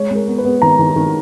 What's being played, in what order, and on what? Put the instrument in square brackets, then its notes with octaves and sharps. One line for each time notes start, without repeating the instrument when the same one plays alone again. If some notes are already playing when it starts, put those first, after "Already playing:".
Already playing: [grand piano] G#3 C#5
G#3 A#4
B3
B4
B3
D#3 A#5
D#3
D#3